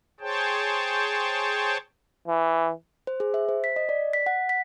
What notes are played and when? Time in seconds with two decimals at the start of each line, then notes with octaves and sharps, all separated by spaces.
0.20 G#4 C5 C#5 G5 A5
2.28 E3
3.07 C5
3.20 G#4
3.34 E5
3.49 C5
3.64 B6
3.76 D#5
3.89 D5
4.13 B6
4.26 F#5
4.49 B6